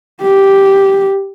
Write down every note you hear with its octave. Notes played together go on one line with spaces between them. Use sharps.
G4